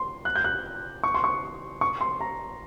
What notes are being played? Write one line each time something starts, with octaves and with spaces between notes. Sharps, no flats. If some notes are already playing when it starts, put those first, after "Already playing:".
Already playing: C6
F#6
G6
F#6
C#6
C6
C#6
C#6
C6
A#5